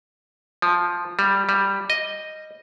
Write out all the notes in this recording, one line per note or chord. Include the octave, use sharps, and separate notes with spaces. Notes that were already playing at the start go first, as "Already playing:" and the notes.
F3
G3
G3
D#5